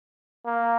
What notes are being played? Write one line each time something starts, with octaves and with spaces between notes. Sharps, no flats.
A#3